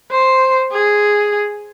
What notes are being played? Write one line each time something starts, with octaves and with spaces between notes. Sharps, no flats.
C5
G#4